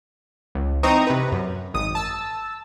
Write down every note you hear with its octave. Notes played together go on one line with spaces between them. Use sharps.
C#2
E3 C4 D#4 A#5 C#6 D#6
C3 B4
F#2
G#1 D#6
A5 E6